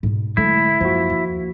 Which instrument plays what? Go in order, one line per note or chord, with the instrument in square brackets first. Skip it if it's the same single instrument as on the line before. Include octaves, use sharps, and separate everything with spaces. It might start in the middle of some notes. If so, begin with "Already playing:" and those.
[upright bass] G#2 B2
[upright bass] D3 G#3 [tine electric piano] F#3 A3 E5 [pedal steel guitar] E4
[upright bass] F#2 [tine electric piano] F3 A#3 F#4
[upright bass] D#2